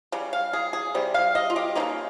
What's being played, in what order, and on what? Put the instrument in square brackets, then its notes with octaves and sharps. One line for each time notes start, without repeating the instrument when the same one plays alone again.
[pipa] C#3 G3
F5
G#4
G#4
C3 G3
F5
D#5
F4
G4
G3 A#3 D#4
C#3